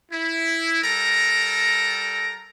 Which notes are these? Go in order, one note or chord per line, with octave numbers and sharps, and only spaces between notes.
E4
G3 A4 A#4 A#5